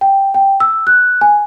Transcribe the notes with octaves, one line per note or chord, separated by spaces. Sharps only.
G5
G5
E6
F#6
G#5